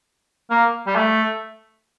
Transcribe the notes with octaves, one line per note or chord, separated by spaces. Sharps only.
A#3
G3
A3